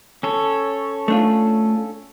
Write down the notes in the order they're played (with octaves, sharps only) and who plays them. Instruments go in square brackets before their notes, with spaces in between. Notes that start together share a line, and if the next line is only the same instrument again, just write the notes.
[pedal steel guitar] C#4 A4 C#5
[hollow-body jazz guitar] A3 D4 F4